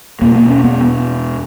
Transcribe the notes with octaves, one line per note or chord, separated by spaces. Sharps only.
E2 B2 A#3
A#3
C#4
B3